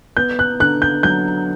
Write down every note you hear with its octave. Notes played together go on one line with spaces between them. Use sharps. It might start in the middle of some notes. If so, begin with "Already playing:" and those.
B3 G6
F#6
D3 F#6
G6
F#3 G6